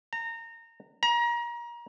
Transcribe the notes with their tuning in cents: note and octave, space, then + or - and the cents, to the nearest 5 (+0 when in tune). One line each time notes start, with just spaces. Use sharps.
A#5 -25
A#5 +30